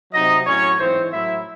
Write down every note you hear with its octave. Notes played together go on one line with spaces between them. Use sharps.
C3 F#3 D#4 D#5
A2 F#3 C#4 C#5
G#2 E3 C4 C5
A2 F#3 E4 E5